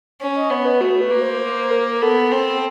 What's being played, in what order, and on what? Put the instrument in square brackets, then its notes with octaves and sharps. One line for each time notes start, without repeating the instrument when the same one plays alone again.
[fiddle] C#4
[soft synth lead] D#5
[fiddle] B3 [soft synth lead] C#5
[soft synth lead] B4
[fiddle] A3 [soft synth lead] F#4
[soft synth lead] B4
[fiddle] A#3
[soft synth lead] C5
C5
A#4
A#4
[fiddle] B3 [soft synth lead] A4
[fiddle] C4